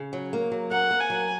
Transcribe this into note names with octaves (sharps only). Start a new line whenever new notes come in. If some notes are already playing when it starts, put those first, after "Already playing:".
Already playing: C#3
F#3
A#3
F#3
A#4 F#5
A#3
G#5
F#3